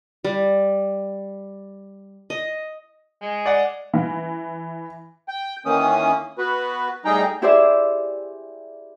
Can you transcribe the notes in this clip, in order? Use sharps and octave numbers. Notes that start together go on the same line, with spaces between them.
G3
D#5
G#3
D5 F#5
E3
G5
D#3 E3 A#3 C#4 D#6
B3 F#4 B4
A2 G3 D#4 G#4 G5 A#5
E4 G4 G#4 C5 D5 E5